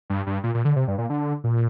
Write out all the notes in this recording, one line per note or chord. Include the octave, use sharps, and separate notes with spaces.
G2
G2
A#2
A#2
D3
C3
G2
A#2
D3
A#2